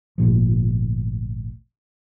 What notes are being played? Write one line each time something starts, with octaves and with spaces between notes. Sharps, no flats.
G#1 D2 A#2 F3